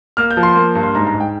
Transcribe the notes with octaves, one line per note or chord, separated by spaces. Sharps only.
A#3 F6
G6
F3
C6
A#3
G2
C6
G#2 A#5
A#5
G#2
G5